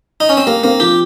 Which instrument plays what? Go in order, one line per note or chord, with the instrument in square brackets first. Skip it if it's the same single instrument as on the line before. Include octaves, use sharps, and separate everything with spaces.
[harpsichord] D#4
C#4
C4
[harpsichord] A#3 [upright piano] G4
[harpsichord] A#3 [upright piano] C4
[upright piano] F3 [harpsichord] G4